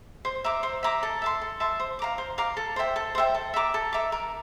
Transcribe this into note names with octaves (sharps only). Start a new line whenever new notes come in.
C5
E5 A#5 D6
C5
E5 A#5 D6
A4
E5 A5 C6
A4
E5 A5 C6
C5
F5 A#5 D6
C5
F5 A#5 D6
A4
C5 E5 G5
A4
C5 E5 G5
A4
E5 A#5 D6
A4
E5 A#5 D6
A#4